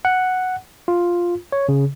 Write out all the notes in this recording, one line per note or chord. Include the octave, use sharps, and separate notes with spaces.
F#5
F4
C#5
C#3